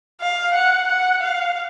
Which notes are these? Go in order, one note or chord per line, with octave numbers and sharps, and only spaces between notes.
F5
F#5
F#5
F5